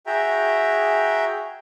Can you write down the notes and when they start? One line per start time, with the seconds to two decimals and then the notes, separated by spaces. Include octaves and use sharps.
0.06 F#4 G#4 E5 G5 A#5